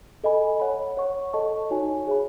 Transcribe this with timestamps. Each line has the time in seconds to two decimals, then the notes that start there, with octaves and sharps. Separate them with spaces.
0.24 A4 D#5 G#5 B5
0.60 C#5 F#5 B5
0.97 C#5 F#5 C#6
1.33 A4 D#5 A5 C#6
1.70 D#4 F#4 C#5 G#5
2.07 G#4 C#5 E5 B5